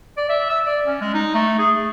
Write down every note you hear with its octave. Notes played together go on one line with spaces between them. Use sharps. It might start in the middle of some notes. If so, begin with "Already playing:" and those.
D5
E5
E6
D5
C#4
G#3
D#4
A3
G#4
A3